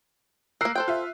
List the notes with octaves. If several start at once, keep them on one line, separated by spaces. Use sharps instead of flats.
A#3 A#4 E6 F#6 C7
A4 C5 G5
F4 E5